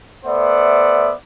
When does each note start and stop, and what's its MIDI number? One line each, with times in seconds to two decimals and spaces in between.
0.25 1.12 57
0.25 1.12 59
0.25 1.12 72
0.25 1.12 74
0.25 1.12 76
0.25 1.12 78